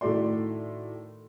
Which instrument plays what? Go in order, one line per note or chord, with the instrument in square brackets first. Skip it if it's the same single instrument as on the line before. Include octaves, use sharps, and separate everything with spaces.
[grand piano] A2 D#3 A3 F#4 D5 C6